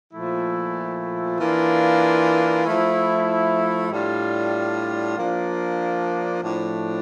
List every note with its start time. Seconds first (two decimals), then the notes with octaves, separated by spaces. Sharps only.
0.14 A#2 F3 A3 E4
1.39 E3 A#3 D4 F4
2.65 F3 A3 E4
3.91 A2 G3 D4 F4
5.17 F3 A#3 D4
6.42 A2 F3 A3 D4